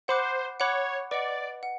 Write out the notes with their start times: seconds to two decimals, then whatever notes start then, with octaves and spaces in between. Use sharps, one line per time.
0.08 C5 F#5 B5 D6 F#6
0.60 C#5 F#5 B5 D6 F#6
1.11 B4 D5 D#5 F#5
1.63 F#5